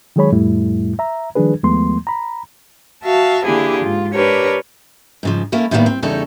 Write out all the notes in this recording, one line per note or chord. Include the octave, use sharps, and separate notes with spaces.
D#3 F#3 G#3 G#4 C#5 B5
F2 A2 G3 A3 E4
E5 A#5
D#3 F3 G3 D4 G#4 B4
D#2 F3 G#3 A3 B3 C6
A#5 B5
F#4 E5 F5 A5
D3 A#3 D4 E4 G4 G#4
G#2 F4
D4 G4 A#4 B4 C#5
G#2 C#3 F3
A3 A#3 C#4 E4
A2 D#3 G3 G#3 A#3 B3
C4
E2 C#3 G3 D#4 A4 C#5